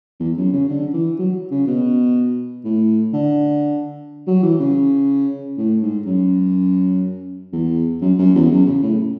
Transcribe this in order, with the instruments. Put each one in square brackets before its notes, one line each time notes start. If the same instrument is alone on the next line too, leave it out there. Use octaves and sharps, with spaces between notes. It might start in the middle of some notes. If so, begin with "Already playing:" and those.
[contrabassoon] E2
F#2
C#3
D3
E3
F#3
C#3
B2
A2
D3
F#3
E3
C#3
A2
G#2
F#2
E2
F#2
F#2
E2
F#2
C#3
A2